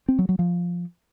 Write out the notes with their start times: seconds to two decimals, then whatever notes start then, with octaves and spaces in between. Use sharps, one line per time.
0.09 C4
0.19 F#3
0.29 F#3
0.39 F3